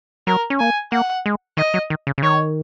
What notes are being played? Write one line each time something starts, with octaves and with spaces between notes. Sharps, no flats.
F#3 A#4
C#4
A#3 G#5
A#3 F#5
G#3
D#3 D#5
F#3
D#3
C#3
C#3
D#3 C#5